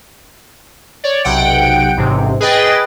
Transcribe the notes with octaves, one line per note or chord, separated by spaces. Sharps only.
C#5 D5
B1 C3 F#5 G5 D7
A1 G#2 C3
G#4 B4 D#5 G5 A6